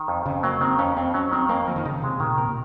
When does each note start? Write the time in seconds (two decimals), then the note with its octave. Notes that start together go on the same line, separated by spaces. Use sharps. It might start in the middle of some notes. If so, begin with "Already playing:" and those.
Already playing: D#3
0.08 F2
0.26 F2 C#3
0.43 F#3 A#3
0.61 D#3 C4
0.78 F2 C#4
0.97 F2 C4
1.14 F#3 C#4
1.31 D#3 C4
1.49 F2 A#3
1.68 F3 A#4
1.76 D#3
1.85 C#3 D#4
2.02 C3 G#3
2.20 A#2 D#3
2.38 C3 A#4
2.49 A#2